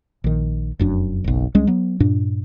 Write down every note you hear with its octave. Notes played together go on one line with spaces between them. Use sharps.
A#1 D#3
F1 F#2 D4
F#1 B1
C#2 G3 G#3 C#4
F#3 B3
G2 A#2 D4